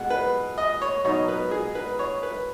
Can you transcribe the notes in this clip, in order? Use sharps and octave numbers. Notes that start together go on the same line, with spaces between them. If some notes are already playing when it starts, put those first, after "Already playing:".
Already playing: B2 G#3 F#5
B4
D#5
C#5
B2 F#3 D#4 C#5
B4
G#4
B4
C#5
B4